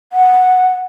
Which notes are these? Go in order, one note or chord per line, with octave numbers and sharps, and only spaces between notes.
F#5